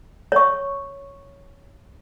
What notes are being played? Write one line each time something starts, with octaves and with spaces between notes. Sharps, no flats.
C#5 C#6